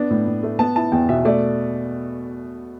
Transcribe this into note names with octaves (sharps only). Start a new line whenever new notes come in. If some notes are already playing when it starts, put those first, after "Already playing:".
Already playing: B3 D4
A2
A2
A3
B3 A5
E4 A5
E2 G5
B2 E5
A3 D5